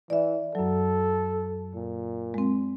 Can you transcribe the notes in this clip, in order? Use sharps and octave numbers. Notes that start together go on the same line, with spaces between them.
E3 D5 E5
F#2 F#3 A4
A#2
G#3 C4